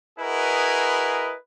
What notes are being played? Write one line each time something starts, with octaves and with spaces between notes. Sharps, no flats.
E4 F#4 G#4 A#4 B4 D#5